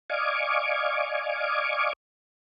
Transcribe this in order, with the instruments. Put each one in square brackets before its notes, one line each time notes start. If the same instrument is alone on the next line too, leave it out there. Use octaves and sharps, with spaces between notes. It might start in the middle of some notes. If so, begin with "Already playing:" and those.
[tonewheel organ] D5 D#5 F5 G#5 C#6 D6